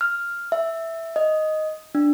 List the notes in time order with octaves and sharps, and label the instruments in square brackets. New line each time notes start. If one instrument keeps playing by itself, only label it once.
[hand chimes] F6
E5
D#5
D4